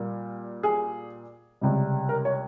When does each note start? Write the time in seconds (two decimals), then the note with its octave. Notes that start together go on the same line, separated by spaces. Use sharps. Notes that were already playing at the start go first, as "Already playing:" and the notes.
Already playing: A#2 G3 A#3
0.63 G#4
1.61 C#2 C3 G3
2.09 A#4
2.25 C#5